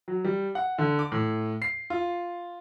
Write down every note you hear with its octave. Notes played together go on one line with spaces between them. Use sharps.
F#3
G3
F#5
D3
D6
A2
C7
F4